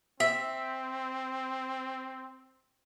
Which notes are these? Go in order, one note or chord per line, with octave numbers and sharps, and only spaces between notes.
C4 E5